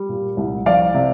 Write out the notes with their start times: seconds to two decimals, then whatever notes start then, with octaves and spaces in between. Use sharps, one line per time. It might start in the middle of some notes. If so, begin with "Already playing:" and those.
Already playing: G3
0.09 A#2
0.37 C2
0.66 F3 D5 F5
0.94 C3